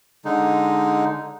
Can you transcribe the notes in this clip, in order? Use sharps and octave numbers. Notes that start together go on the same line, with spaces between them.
D3 G#3 D#4